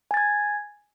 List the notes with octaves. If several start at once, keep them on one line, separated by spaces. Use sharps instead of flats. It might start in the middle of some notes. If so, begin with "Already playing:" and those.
G#5 G#6 A6